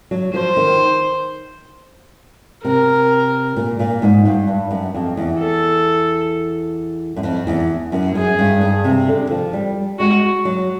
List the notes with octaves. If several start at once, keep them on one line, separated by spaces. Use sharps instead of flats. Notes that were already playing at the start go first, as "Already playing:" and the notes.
F#3
F3 C5
D#3
C3 A#4
A#2
A#2
G#2
G2
G2
F#2
F2
E2
A4
F#2
F2
E2
F#2
F#2 G#4
G2
G2
C3
D3
F3
G3
G#3 F#4
F#3